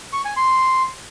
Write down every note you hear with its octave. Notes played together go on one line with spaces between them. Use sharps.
C#6
G#5
C6